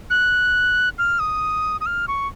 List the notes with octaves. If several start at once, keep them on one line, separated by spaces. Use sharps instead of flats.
F#6
F6
D#6
D#6
F6
C#6